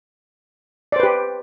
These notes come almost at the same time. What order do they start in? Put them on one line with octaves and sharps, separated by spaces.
D5 C5 B4 G4